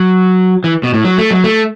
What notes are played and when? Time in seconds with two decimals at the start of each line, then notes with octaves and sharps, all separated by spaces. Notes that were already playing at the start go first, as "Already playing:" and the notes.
Already playing: F#3
0.64 E3
0.83 B2
0.94 A2
1.04 F#3
1.18 A3
1.31 F#3
1.44 A3